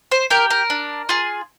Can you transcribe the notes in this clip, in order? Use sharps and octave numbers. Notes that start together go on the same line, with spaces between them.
C5
G4 A#4
A#4
D4
F4 G#4